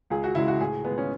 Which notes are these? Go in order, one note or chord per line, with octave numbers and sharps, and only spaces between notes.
C#2 G#4
F#4
C#3 G#3 E4
F#4
A2 G#4
G#3 B3
C#4